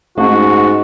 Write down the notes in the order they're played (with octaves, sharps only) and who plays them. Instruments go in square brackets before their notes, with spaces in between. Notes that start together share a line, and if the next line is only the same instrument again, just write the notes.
[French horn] G#2 [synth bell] A3 C#4 [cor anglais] F#4